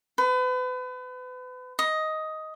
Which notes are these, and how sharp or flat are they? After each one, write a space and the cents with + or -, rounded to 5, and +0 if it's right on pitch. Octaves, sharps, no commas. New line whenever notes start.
B4 +35
D#5 +10